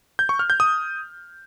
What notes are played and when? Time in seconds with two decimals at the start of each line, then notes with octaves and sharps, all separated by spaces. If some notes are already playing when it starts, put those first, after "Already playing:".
0.19 G6
0.29 C#6
0.39 F6
0.50 G6
0.60 D#6